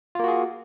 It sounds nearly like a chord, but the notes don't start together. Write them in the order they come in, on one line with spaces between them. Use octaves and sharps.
F4 A#3 F#4 G#4